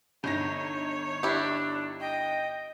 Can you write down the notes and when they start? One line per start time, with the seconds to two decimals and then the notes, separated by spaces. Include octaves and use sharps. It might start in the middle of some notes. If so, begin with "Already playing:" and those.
0.24 G1 D#4 C#5 A#6
1.23 D4 E4 G4
2.00 D#5 G5